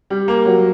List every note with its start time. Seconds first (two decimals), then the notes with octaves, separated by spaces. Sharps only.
0.10 G3
0.28 A#3
0.46 F#3